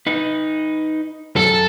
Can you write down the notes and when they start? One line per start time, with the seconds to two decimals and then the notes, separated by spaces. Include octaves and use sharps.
0.07 D#4 B4
1.36 F#2 A4